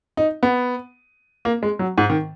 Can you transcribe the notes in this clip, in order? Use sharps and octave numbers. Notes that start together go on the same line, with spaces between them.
D#4
B3
A#3
G#3
F#3
G#2
D#3